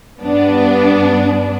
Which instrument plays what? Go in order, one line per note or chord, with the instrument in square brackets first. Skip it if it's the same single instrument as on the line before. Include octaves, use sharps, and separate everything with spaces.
[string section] G2 B3 D4